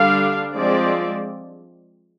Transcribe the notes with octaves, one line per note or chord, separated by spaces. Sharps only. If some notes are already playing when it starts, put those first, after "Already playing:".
Already playing: D3 G3 D4 F5
F3 G#3 C4 D5